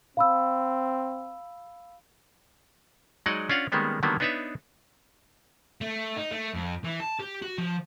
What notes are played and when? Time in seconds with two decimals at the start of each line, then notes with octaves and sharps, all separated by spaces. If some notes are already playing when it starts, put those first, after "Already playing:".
0.17 C4 F5 B5 E6
3.26 F#3 G#3 D#4 D5 D#5 F#5
3.49 C#4 D4 F4 F5 F#5
3.72 D#3 G3 G#3 A#3 B3 C#4
4.03 D3 D#3 F#3 G3 A#3 B3
4.20 B3 D4 D#4 B4 C#5 E5
5.81 A3
6.16 D#4
6.31 A3
6.54 F2
6.84 E3
7.00 A5
7.20 G4
7.42 F#4
7.58 F3